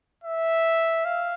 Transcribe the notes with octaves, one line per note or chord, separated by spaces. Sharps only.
E5
F5